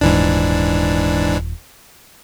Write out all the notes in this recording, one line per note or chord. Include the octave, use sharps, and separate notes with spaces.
D#1 G#2 E3 D4